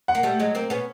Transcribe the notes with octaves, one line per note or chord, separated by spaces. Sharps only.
F#5
A#3
G3 A3
F#3 G#3
A#3 C4
B3 C#4